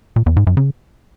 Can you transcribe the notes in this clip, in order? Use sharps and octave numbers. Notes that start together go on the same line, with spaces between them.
A#2
E2
G#2
F#2
C#3